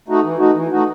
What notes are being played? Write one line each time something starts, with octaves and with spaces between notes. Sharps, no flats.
A3 D#4 F#4
E3
A3 D#4 F#4
E3
A3 D#4 F#4